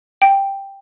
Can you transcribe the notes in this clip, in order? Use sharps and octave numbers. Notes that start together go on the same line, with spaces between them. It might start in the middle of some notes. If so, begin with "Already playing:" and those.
G5